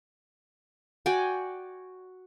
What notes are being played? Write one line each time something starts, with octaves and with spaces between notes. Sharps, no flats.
F#4 D5 G5 G#5